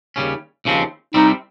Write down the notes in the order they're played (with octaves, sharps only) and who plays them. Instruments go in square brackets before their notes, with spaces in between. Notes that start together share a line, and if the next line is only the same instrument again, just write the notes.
[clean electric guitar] D#2 C#3 G3 C#4
D#2 C#3 F3 C4
[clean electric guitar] C2 C3 G3 C4 [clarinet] D#4